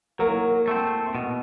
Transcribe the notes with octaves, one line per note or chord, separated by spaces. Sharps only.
F#3 A#3 A#4
A3 C4
B2